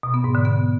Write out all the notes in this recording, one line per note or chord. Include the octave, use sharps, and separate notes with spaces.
B2
B3
G#2
D3
B3